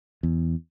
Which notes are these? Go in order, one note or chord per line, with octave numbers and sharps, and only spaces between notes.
E2